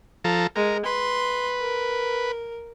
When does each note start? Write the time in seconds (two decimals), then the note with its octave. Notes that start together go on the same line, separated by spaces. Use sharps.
0.24 F3 A4 A#5
0.56 G#3 A#4
0.86 B4 C6
1.61 A#4